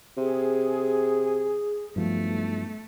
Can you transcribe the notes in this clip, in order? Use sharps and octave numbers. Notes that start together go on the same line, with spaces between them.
C3 G#4
B1 G2 F3 A3